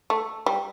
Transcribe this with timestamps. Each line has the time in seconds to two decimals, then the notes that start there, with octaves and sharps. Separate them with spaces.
0.10 A3
0.46 G3